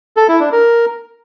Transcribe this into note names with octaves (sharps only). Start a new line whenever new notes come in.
A4
E4
D4
A#4